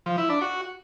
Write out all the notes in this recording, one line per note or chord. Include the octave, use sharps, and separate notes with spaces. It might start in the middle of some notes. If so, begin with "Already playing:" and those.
F3
E4
D4
F#4